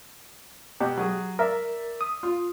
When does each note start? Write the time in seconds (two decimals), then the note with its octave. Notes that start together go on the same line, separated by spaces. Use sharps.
0.80 B2 G4
0.98 F#3 G#4
1.39 A#4 D5 E5
2.01 D#6
2.23 F4